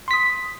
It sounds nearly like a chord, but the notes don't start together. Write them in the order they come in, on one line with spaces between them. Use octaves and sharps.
C6 B6 D#6